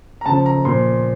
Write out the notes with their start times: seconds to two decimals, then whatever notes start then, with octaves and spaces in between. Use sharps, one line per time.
0.21 A#5
0.26 C#3 F3 A5
0.46 A#5
0.65 A#2 F3 C6